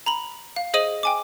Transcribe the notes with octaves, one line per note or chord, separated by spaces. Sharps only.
A#5 B5 F#7
F5
G#4 C5 D#5 D#6 D#7 F#7
G5 G#5 D6